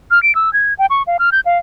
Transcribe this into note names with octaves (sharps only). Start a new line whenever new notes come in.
F6
D7
E6
G#6
G5
C#6
F5
F6
G6
F5